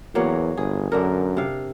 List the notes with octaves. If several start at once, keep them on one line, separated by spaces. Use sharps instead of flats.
E2 F#3 A#3 C#5
G1 G#4
F#2 D3 D4 A#4
C3 F5